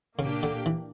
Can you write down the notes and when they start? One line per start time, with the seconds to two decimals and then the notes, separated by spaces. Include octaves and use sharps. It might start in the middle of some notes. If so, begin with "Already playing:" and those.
0.19 A#2 C#3 A#3 D4 G4
0.43 D3
0.66 E3